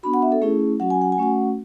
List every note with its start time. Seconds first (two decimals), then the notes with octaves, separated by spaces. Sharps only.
0.03 B3 D4 F#4 B5
0.14 F#5
0.22 E5
0.32 A4
0.41 A3 C#4 E4 G#4
0.80 F#3 C#4 F#4 F#5
0.90 G#5
1.02 F#5
1.12 G#5
1.18 A3 C#4 F#4 F#5